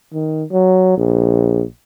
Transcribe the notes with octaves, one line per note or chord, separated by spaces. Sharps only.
D#3
F#3
A#1